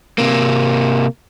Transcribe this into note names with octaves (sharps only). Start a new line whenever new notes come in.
C3 A#3